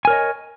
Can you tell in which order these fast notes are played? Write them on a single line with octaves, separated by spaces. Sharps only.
G#5 A#4 C#5 D#5